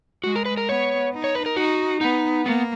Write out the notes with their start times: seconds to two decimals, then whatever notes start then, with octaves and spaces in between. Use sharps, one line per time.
0.24 G#3 F#4
0.36 A#4
0.45 B4
0.57 A#4
0.69 B3 C#5
1.13 D#4
1.24 C#5
1.35 B4
1.46 A#4
1.56 D#4 F#4
2.01 B3 D#4
2.45 A#3 B3